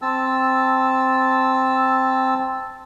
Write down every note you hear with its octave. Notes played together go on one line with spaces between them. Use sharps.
C4 A5 E6